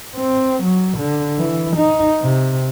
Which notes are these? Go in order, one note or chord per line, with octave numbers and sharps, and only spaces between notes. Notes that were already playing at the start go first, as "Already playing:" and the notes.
C4
F#3
D3
E3
D#4
C3